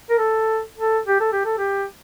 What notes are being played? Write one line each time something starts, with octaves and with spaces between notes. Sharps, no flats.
A#4
A4
A4
G4
A4
G4
A4
G4